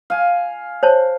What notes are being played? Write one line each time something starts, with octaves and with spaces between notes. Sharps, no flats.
F5 G#5
C5 C#5 A5